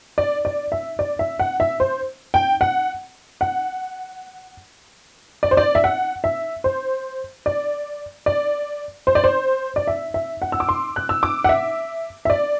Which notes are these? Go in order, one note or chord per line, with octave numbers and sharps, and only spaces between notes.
D5
D5
E5
D5
E5
F#5
E5
C5
G5
F#5
F#5
D5
C5
D5
E5
F#5
E5
C5
D5
D5
C5
D5
C5
D5
E5
E5
F#5
E6
D6
C6
F#6
E6
D6
F#5
E5
E5
D5